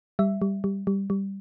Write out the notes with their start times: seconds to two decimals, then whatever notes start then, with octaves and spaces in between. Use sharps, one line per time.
0.19 G3 E5
0.42 G3
0.64 G3
0.87 G3
1.10 G3